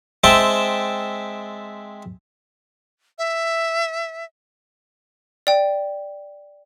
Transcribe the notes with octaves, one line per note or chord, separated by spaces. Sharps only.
G#3 C4 E5 G5 A5
E5
D5 G5